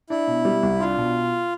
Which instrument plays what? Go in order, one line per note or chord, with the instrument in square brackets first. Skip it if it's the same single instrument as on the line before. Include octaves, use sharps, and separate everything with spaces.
[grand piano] D4 [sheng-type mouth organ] E4
[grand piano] B2
G3
C2
[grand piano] D4 [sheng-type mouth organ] F4
[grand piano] B2